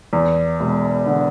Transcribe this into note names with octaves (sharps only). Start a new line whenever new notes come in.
E2
E1
D3